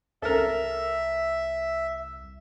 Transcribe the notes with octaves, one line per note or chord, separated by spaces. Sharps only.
C2 A4 A#4 E5